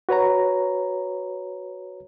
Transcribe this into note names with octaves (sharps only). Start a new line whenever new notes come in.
F#4 B4 C#5 A#5